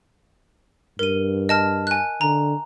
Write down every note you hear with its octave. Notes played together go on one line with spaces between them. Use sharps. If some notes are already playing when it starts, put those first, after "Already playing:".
G2 A#4 D#7
D#5 A5 F6
G#5 F#6
D3 A#5